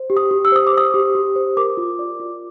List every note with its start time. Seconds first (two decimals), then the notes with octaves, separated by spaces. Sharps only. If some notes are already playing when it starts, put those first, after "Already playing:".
Already playing: C5
0.10 G4
0.17 D#6
0.31 G4
0.45 E6
0.52 C5 D#6
0.67 D6
0.73 C5 D#6
0.94 G4
1.15 G4
1.36 C5
1.57 A#4 D6
1.77 F4
1.99 D5
2.20 F4